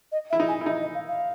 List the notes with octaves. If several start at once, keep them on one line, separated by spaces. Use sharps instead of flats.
D#5
E4 E5
D#4
G#5
E4
D#4 E5
D#5
F5
F5